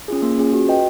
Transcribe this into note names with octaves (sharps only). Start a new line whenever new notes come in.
C#4 F4 G#4
A#3
C#4 F4 G#4
F#4
B4 D#5 G5